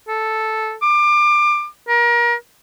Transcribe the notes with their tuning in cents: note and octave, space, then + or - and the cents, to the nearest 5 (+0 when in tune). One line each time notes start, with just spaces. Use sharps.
A4 -5
D6 +25
A#4 +30